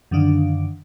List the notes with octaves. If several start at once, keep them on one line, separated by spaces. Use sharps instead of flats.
F#2 D3 D#3 D4 F5